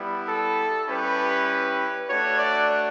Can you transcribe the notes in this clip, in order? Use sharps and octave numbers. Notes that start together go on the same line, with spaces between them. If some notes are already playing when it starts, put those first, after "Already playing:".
Already playing: G3 B3 E4
A4
G3 C#4 E4 G4 B4
A3 D4 F#4 C#5
D5